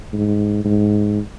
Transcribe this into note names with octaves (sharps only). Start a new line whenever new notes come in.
G#2
G#2